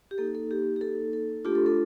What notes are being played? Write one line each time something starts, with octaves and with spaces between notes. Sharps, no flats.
G4
A#3 D#4 A4
A4
G4
G4
A4
A4
A3 D4 F4 G4
A4
A4